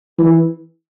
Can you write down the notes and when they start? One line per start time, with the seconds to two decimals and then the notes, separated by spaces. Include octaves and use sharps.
0.19 E3